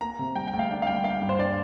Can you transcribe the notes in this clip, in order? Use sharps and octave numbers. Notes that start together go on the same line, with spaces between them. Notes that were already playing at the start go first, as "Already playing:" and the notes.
A#3 A#5
C3
G3 G5
G5
D2
F5
D4
F5
G3 G5
A#3 F5
G2
C5
D4 D5